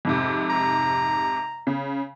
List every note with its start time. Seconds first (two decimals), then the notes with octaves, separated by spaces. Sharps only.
0.05 F2 G#2 C3
0.50 A#5
1.67 C#3